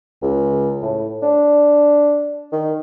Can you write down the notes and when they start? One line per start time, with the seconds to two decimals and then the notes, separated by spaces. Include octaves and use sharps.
0.22 C#2
0.82 A2
1.22 D4
2.52 D#3